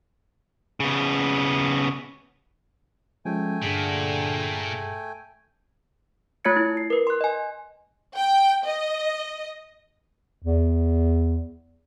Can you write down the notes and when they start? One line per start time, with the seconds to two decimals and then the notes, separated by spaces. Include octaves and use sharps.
0.80 C#3 B3
3.25 F3 G#3 A3 C#4 G5 G#5
3.63 G2 A#2 D3 G#4 B6
6.45 A3 F4 C#5 G#6 A6 C#7
6.57 E4
6.77 C7
6.90 A#4 B4
7.07 C6 F#6
7.21 D#5 G#5
8.17 G5
8.66 D#5
10.43 E2